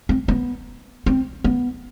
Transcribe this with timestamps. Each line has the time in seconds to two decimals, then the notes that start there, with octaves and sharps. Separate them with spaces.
0.09 C4
0.28 B3
1.06 C4
1.44 B3